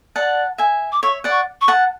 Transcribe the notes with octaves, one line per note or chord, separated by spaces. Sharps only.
D5 F#5 A5
E5 G#5
D6
C#5 E5 C#6
D5 F#5
C#6
C#6
F#5 A5